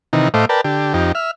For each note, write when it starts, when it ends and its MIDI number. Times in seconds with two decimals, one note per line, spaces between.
0.13 0.29 48
0.13 0.29 51
0.13 0.29 52
0.13 0.29 63
0.34 0.45 45
0.34 0.45 57
0.34 0.45 72
0.34 0.45 75
0.34 0.45 77
0.34 0.45 86
0.49 0.61 70
0.49 0.61 71
0.49 0.61 74
0.49 0.61 79
0.49 0.61 81
0.64 0.93 50
0.64 0.93 67
0.94 1.12 41
0.94 1.12 63
0.94 1.12 67
1.15 1.31 76
1.15 1.31 89